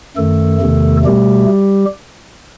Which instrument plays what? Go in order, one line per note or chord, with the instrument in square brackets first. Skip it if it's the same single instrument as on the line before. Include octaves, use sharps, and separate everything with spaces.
[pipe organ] F#2 D#3 A3 A4
E2 C3 D#3 A3
B2 G3 A3 G4